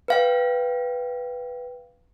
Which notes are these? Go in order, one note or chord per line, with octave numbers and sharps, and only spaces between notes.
B4 F5 G5